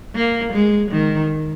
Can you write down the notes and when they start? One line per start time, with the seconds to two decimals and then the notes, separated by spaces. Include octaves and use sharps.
0.15 A#3
0.53 G#3
0.91 D#3